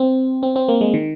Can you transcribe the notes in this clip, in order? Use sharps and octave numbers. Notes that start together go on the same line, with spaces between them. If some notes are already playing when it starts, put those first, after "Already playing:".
Already playing: C4
C4
C4
A#3
G#3
D#3